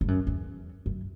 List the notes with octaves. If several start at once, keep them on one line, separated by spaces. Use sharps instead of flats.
G2
F#2
E2
F#2